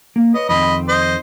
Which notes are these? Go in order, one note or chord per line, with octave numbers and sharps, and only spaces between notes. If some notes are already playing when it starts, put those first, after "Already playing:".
A#3
B4 C#5 D#5
F2 D#3 C4 D#5 B5
C5 D#5